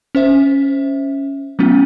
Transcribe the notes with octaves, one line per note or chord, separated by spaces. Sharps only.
C#4 C5 E5
F#3 A3 B3 C#4 F4